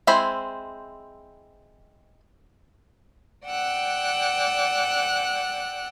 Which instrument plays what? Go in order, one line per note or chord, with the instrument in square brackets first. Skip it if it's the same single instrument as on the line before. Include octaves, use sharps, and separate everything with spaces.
[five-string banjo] G#3 C4 E4 C5 B5
[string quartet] D5 F#5 G5 E6 F#6